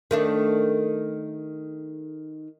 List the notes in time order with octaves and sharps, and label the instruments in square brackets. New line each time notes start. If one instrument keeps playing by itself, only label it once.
[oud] D#3 A3 D4